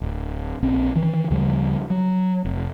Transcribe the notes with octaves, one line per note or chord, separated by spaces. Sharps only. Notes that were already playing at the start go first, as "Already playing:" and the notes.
D1
A#1 C4 C#4
D#3 E3
D2 C#3 F3 G3
F#3
F1